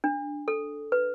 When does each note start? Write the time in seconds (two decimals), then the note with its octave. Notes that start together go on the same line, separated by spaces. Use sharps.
0.04 D4
0.48 A4
0.92 B4